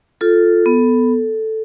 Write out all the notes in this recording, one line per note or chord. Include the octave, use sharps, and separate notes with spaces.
F4 A4
B3